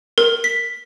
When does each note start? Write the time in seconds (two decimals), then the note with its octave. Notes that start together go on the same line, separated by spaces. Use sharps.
0.18 A#4
0.44 B6